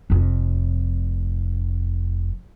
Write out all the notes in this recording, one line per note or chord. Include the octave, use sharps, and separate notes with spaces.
F1 F2